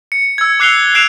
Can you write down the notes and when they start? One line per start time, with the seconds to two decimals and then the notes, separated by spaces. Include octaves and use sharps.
0.12 C#7
0.38 E6 G#6
0.60 D6 F#6 C7 F7 G7
0.95 F#6 C7 D7 E7 F7